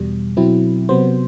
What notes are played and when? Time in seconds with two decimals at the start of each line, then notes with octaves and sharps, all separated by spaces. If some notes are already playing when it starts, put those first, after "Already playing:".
Already playing: E2 B2 G3
0.37 B2 F#3 C4 E4
0.89 C3 F#3 B3 C5